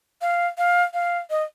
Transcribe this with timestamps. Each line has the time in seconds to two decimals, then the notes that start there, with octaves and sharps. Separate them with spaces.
0.21 F5
0.58 F5
0.94 F5
1.30 D#5